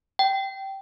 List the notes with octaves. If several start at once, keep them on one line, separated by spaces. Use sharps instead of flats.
G5